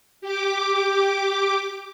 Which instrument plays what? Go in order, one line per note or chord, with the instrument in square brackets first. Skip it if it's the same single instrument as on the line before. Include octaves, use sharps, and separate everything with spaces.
[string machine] G4 D6